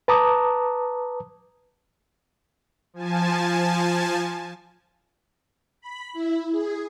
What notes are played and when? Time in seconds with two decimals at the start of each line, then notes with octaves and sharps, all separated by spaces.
0.08 B4 A5 A#5 D6 D#6
2.94 F3 G#5 A5
5.81 B5
6.13 E4
6.51 G#4